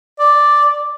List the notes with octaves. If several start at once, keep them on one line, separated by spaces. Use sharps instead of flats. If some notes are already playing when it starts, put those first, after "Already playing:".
D5